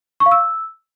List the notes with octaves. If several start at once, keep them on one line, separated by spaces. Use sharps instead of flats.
C#6
F5
E6